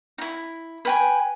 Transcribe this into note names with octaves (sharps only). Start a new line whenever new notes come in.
D#4 E4
B4 G5 G#5